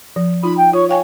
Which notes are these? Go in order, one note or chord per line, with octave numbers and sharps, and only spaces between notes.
F3
D#4 F4 B5
G5
F4 C#5
C#5 F5 G5 G#5